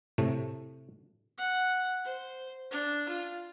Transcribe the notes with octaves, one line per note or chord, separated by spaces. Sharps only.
A2 C3 A3
F#5
C5
D4
F4